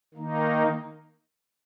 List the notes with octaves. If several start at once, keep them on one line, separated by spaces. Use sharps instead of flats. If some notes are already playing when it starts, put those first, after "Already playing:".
D#3 A#3 D#4